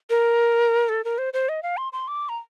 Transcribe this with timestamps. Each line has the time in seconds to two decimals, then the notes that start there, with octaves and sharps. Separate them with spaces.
0.10 A#4
0.89 A4
1.04 A#4
1.18 C5
1.33 C5
1.49 D#5
1.63 F5
1.77 C6
1.93 C6
2.08 D6
2.29 A#5